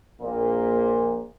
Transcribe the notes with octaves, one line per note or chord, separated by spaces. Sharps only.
A#1 A#2